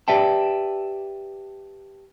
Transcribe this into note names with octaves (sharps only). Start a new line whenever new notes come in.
G4 B4 D5 E5 G5 A5